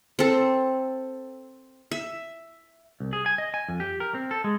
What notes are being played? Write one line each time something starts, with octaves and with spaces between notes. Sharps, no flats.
C4 A4
E5
C2
G#4
G#5
D#5
G#5
F2
G4
A#4
C4
A4
G#3